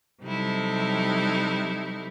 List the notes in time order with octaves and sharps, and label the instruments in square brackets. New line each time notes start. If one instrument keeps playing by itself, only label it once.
[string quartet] C3 F#3 G3 D#4 E4 A4